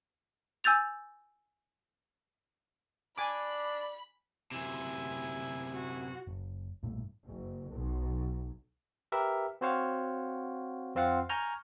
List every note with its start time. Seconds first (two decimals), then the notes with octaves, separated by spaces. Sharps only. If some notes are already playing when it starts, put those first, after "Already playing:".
0.64 G#5 E6 G6 A6 F7
3.18 D4 D5 G#5 B5 D6
4.51 F#2 C3 E4 G#5
5.74 F#4
6.27 F#1
6.83 B1 G2 A#2 A3
7.25 F#1
7.71 B1
9.12 G4 A#4 B4 E5
9.61 C4 F#4 C5 C#5 F5 F#5
10.95 F2 C4 F4 F5 F#5
11.29 G#5 A#5 C#6 F6 G6